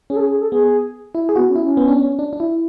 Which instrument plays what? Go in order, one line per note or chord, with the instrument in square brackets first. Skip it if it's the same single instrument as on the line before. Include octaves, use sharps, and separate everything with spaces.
[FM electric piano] C#4 [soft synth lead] G#4
[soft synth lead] A4
G#4
G#4
A4
[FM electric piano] B3 [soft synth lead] G#4
[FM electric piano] E4
G#4
[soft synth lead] B3 [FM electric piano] F#4
[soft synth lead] C#4
[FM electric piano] E4
[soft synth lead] C#4
[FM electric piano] B3
D4
C#4
D4
D4
E4